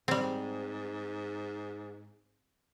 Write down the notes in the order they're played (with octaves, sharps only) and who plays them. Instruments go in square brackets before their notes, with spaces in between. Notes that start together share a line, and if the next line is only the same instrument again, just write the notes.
[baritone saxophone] G#2 [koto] G3 C4